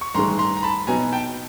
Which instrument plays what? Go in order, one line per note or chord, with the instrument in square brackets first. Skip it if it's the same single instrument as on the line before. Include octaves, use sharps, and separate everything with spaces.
[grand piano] C#6
[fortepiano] A1 G2 D#3 G#3 [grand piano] A#5 C6
[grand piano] A#5 C6
A#5
A5 B5
[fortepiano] B2 F#3 B3 D#4 [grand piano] G#5 A#5
[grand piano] G5 A5